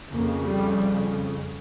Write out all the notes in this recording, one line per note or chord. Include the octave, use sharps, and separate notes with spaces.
F2 C#3 A#3
G3